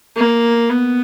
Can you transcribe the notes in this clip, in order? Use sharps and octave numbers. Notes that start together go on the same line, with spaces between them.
A#3
B3